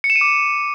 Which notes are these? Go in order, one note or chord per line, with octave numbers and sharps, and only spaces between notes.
C#7
E7
D#7
D6